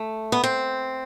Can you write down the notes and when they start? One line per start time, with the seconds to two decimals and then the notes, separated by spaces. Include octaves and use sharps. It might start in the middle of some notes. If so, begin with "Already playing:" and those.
Already playing: A3
0.32 B3
0.44 C4